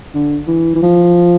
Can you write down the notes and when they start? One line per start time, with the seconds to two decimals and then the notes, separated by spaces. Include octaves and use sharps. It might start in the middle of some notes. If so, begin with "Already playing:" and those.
0.14 D3
0.48 E3
0.75 E3
0.82 F3